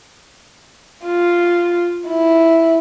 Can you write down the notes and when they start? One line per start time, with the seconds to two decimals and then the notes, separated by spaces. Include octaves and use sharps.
1.06 F4
2.09 E4